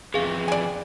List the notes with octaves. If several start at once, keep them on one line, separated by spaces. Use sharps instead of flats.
F2 E3 G#4 F5
D5 G#5